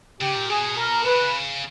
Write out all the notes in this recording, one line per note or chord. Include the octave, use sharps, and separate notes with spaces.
C#3 G4
A#2
B2 G#4
A#4
C#3 B4